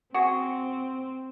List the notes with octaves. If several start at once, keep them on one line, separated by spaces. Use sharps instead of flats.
C4 F#4 G#4